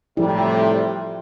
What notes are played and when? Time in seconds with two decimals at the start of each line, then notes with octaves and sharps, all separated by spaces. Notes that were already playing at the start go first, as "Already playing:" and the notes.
0.17 A2 C3 F3 G3 E4